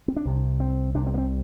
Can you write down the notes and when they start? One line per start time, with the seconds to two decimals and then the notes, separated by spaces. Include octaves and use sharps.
0.08 C4
0.16 D4
0.25 C2 C3
0.60 C4
0.95 C2 C3 D4
1.07 C4
1.14 A#3
1.18 C4